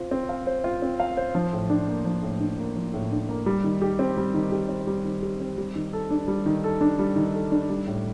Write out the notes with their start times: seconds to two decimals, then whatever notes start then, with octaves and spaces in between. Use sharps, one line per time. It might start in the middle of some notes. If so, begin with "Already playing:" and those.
Already playing: C4 F4 C5
0.11 C4
0.29 F5
0.47 C5
0.64 F4
0.82 C4
1.00 F5
1.17 C5
1.35 F3
1.53 A2
1.70 D4
1.88 A#3
2.05 F3
2.23 A2
2.40 D4
2.58 A#3
2.76 F3
2.94 A2
3.11 D4
3.29 A#3
3.46 G3
3.64 D#3
3.82 G4
3.99 C4
4.17 G3
4.34 D#3
4.52 G4
4.69 C4
4.87 G3
5.04 D#3
5.22 G4
5.40 C4
5.58 G3
5.75 D#3
5.93 A4
6.10 D4
6.28 G3
6.46 D#3
6.64 A4
6.81 D4
6.99 G3
7.16 D#3
7.34 A4
7.52 D4
7.69 G3
7.87 A2